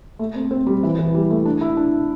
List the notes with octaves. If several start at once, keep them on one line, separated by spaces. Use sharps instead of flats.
A3
C4
C4
G3
E3
E3
G3
A3
D4
E4
D4